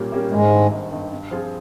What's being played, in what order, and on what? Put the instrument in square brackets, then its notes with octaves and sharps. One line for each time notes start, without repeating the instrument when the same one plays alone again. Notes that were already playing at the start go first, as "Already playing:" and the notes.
Already playing: [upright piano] A#2 G3 A#3 C#4 G4
G3 A#3 C#4 G4
[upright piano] G#1 [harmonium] G#2 G#3
[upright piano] G2 D#3
G#1
G2 D#3
G2
F3 C4 F4 G#4